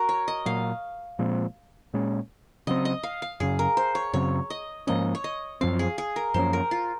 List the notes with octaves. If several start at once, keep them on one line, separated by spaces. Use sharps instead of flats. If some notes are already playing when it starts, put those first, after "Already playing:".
Already playing: F#4 A#4
C#5
D#5
A#2 F#3 A#3 F5
A#2 F3 G#3 C4
A#2 G#3 C#4
C#3 F#3 C4 D#5
D#5
F5
F5
F#2 C#3 F#3 G#4
A#4
C5
C#5
F#2 C#3 F#3 C4 C#5
D#5
G#2 F3 A#3 C#4 D#5
C#5
D#5
F#2 F3 C4 F5
G#4
G#4
A#4
F#2 F3 A#3 C#4 C5
A#4
F4